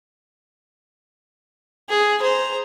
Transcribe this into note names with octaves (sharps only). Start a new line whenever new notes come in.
G#4
C5 A#5